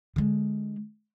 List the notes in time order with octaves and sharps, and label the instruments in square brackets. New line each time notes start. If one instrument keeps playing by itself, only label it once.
[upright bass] D3 G#3